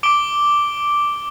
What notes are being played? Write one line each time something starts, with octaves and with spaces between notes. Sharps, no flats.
D6 D7 G7